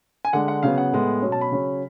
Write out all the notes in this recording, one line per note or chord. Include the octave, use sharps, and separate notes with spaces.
G#5
D3 G#3 D4 F#5
F#5
C#3 F#3 B3 F5
F#5
A2 G#3 B3
B2 F#3 C#4
A5
B5
C#3 F#3 C#4